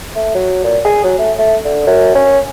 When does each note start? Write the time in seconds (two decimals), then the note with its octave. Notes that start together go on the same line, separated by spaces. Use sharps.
0.15 A3
0.34 F#3
0.64 A#2
0.85 G#4
1.04 F#3
1.18 A3
1.38 A3
1.64 D3
1.87 F#2
2.15 C#4